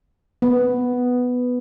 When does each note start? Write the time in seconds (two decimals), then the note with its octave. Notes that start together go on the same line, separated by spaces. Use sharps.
0.42 B3